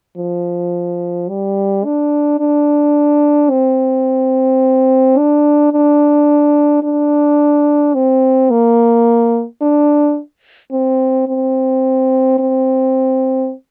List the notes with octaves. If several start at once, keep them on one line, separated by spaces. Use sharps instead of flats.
F3
G3
D4
D4
C4
D4
D4
D4
C4
A#3
D4
C4
C4
C4